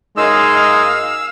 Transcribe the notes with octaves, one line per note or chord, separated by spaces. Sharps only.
F#2 G#3 D#4 D#5 F5 E6